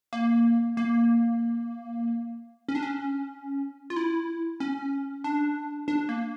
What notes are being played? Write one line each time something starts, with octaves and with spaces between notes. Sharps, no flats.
A#3
A#3
C#4
D4
C#4
F4
E4
C#4
D4
D4
A#3